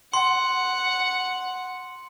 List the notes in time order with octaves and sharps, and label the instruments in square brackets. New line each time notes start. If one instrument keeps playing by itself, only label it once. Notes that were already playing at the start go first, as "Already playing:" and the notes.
[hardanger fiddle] F#5 [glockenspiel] C6